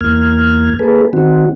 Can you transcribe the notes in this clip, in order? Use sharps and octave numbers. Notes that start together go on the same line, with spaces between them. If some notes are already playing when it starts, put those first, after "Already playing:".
E2 A#3 F6 G#6
A#3 G#4 A4 B4
D#3 C4 F#4